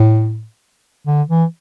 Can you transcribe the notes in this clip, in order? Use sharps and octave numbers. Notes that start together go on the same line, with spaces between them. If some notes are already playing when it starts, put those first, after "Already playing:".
Already playing: A2
D3
E3